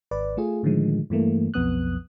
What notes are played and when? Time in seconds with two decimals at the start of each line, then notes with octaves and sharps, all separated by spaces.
0.11 G#1 B4 D5
0.37 A3 F4 G#4
0.63 A2 D3 D#3 F3 G#3
1.10 G2 E3 A3 A#3
1.54 B1 F2 B3 D#6 F#6